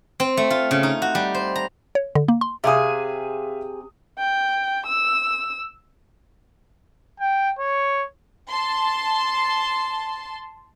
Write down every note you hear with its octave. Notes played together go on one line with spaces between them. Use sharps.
C4
A3
F4
C#3
D#4
F#4
G3
C5
A#5
C#5
D3
A#3
C6
C3 G#4 E5 F5 G#5 D#6
G5
E6
G5
C#5
A5 C6